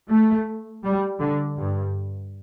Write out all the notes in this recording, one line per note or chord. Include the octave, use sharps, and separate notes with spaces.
A3
G3
D3
G2